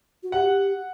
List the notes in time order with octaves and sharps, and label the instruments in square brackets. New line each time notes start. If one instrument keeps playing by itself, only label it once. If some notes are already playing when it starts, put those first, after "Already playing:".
[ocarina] F#4
[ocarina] G4 [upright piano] F#5